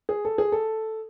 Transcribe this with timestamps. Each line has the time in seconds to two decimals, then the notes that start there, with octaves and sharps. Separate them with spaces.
0.09 G#4
0.25 A4
0.38 G#4
0.52 A4